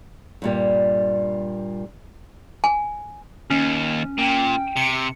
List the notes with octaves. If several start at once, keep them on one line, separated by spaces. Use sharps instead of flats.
G2 A#2 G3
G#5
D#2 C#4
A#2 G5
C3 C#7